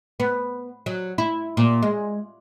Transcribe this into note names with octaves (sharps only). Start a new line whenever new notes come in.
B3
F#3
E4
A#2
G#3